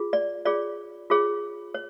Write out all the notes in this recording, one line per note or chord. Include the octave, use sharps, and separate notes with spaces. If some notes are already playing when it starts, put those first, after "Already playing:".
Already playing: F4 G#4
D5
F4 G#4 C#5 D5
F4 G#4 C#5
C#5